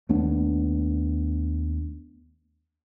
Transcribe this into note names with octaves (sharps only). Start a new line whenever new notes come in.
D#2 A3 B3 D4